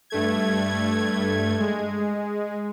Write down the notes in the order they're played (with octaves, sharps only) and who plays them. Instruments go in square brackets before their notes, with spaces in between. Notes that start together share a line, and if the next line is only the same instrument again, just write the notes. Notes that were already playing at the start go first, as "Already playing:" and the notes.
[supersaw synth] G2 A3 G#6
G#3